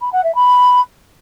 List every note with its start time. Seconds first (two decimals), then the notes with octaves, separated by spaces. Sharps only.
0.01 B5
0.13 F#5
0.24 E5
0.35 B5